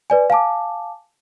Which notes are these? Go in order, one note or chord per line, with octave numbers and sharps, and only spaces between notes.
B4 D5 G#5
F5 G#5 A5 D6